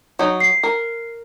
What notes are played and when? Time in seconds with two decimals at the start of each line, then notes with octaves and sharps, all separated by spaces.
0.19 F#3 D#4
0.40 C7
0.63 A#4